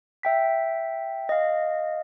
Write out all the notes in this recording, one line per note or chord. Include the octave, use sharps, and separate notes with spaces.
E5 G5 B6
D#5 F5